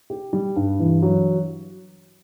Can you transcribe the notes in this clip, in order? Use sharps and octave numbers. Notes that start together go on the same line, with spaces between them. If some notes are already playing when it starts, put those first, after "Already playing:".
G4
G3
G2
E3
F#3